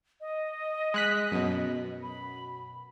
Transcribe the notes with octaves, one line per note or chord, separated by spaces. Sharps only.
D#5
G#3 F#6 B6
F#2 B2
B5